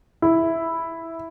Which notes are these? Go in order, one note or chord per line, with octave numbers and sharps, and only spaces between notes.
E4